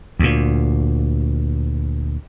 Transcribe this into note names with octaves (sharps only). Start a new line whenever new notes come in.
D2 A#2